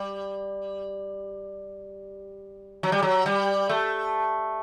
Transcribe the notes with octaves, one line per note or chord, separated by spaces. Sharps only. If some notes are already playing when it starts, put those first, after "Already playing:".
Already playing: G3
F#3
G3
F#3
G3
A3